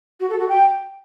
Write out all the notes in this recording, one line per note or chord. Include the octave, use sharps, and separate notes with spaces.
F#4
A4
F#4
G5